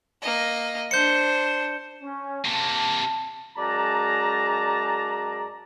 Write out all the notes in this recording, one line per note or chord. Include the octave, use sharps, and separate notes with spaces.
A#3 D#5
D4 C5 G6 C#7
C#4
C3 A#3 A5
F#2 G#3 D5 A5 A#5